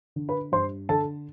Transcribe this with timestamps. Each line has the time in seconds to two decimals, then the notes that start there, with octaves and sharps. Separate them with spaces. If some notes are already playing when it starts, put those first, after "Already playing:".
0.16 D3
0.29 B4 B5
0.52 G2 C5 C6
0.89 D3 A4 A5